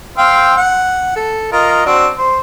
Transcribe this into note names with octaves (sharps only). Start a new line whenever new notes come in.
C4 F5 G5
F#5
A4
F4 A#4 D#5
C4 D4 F#4
C5